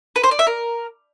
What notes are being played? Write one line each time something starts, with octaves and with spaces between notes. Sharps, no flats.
B4
C5
D5
E5
A#4